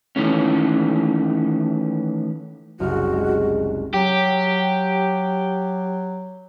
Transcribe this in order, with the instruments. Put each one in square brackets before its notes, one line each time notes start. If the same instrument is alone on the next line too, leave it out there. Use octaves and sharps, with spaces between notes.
[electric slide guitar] D#3 E3 A3 C#4
[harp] F#1 C2 F6 [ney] F#4
[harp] G#3
[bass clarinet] F#3 [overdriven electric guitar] G4